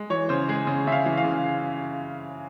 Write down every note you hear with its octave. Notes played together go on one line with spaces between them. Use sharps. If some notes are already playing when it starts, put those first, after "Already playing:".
Already playing: G#3
E3 C#5
C#3 C5
G#3 G#4
C#3
C#3 E5
F5
E3
F5
C#3